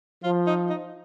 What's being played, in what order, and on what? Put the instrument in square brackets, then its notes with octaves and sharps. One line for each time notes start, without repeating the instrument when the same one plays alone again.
[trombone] F3 [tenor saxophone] F4
[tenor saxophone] D#4
D#4